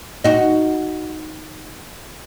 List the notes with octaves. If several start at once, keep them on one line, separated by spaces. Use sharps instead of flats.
D#4 F#4